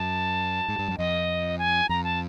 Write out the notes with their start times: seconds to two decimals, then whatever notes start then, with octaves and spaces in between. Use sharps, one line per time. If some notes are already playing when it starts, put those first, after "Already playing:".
Already playing: F#2 A5
0.68 G#2
0.79 G2
0.88 F#2
0.98 F2 D#5
1.58 G#5
1.89 F2 A#5
2.04 A5